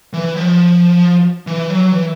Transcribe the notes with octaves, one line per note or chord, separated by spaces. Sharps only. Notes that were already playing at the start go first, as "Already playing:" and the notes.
E3
F3
E3
F#3
E3